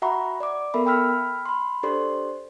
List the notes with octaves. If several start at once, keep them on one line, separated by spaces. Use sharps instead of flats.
F#4 E5 F#5 A#5 B5 C#6
D5 D6
B3 A4 A#4 E5 B5
G5 B5 E6 F6 B6
B5 C6
D4 G4 A4 C5 D5 C6